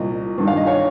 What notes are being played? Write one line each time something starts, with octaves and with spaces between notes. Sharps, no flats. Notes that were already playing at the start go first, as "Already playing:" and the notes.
Already playing: C2 A#2 D#5
G2 D#3
F5
D#5
C#5 F5